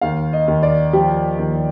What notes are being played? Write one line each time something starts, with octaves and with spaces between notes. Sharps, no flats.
D#2 F5
D#5
D#2
D5
F3 G4
D#2